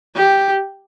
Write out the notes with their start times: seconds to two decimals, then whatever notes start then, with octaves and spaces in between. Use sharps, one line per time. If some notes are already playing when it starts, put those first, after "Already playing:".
0.16 G4